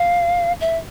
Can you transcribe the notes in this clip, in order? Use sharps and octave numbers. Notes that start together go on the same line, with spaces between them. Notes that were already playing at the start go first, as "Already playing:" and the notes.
Already playing: F5
E5